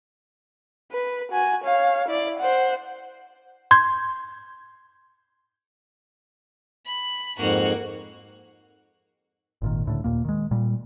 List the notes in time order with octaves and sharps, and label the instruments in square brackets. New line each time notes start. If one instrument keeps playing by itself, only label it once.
[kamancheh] B4
F#4 G#5
C#5 F5
E4 D5
C5 F#5
[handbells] C6 G6 G#6
[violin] B5
[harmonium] F2 G#2 [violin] A#3 F#4
[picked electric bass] G#1 A#2 D#3
C#2 A2 D3
D#2 A#2 A#3
D#3 G#3
A#2 G3